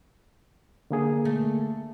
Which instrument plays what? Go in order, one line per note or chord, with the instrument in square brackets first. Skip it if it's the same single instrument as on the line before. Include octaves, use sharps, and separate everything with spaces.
[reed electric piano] D3 A#3 G#4
[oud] A3